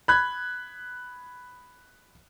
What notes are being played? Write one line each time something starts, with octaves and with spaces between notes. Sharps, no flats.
B5 F#6 G#6